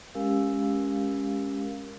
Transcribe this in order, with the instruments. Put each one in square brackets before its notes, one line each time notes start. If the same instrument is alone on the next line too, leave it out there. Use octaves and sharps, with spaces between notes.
[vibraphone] G#3 C#4 G4 A#4 F5 E6